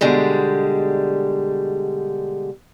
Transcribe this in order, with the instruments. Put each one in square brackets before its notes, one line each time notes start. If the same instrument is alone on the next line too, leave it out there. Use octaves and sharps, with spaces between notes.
[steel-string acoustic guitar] B2 D3 G3 G#3